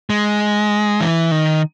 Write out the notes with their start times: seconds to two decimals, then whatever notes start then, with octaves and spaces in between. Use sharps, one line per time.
0.10 G#3
1.01 E3
1.31 D#3